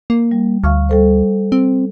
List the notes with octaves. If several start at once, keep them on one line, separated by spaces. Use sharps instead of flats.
A#3
G3
D2 F5 C#6 F6
G3 A4 C5
C4